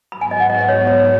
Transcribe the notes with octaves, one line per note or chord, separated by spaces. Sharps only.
G#2 F#3 B3 F#4 B5
G#5
D#5
F#5
D#5
D#5
C#5
C#5